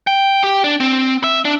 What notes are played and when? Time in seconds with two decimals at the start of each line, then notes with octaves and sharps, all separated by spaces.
0.07 G5
0.43 G4
0.64 D4
0.80 C4
1.24 E5
1.45 D4